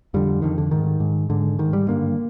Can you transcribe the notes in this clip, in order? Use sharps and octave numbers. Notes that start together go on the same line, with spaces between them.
F2 D3 G3
F2 D3 D#3
D3
G#2 D#3
G#2
G#2 D3
G#2 D#3
G3
G2 D3 A#3